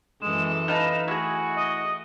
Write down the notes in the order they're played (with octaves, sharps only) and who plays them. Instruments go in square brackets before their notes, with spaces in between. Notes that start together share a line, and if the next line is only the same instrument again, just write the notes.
[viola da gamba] F#2 E3 A4 [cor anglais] G#3 [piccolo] E7
[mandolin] D#4 B4 A5 [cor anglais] F5
[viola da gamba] A3 [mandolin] E4 G#4 [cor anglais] F#4
[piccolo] D#5